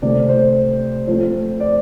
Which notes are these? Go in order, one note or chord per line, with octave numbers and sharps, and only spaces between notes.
C3 A3 C4 D5
C5
F3 A3 C4 C5
D5